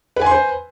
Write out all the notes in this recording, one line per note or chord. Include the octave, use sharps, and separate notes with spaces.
B4 C5 G#5 C6